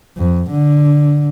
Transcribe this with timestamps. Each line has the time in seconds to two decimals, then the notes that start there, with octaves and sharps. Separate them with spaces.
0.17 F2
0.51 D3